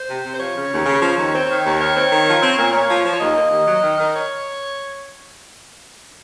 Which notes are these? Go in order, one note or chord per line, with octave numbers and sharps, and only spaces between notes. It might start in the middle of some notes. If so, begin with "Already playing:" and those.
Already playing: C5
C3
C3
C5
F3 C#5
C#3
D#2
C#3
F3
D#2
C4
D#3
D#2
D#3 C#5
C4
D#3
F3
C4
A#2
A#2 C#5
F3
F3
C#5
D#2 D#5
A#3
D#2
F#3
D#3
D#3
C#5